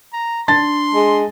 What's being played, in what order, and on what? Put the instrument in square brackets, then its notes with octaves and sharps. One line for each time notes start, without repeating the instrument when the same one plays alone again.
[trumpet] A#5
[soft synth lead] D4 [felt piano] A5 A6 [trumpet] C6
[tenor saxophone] G#3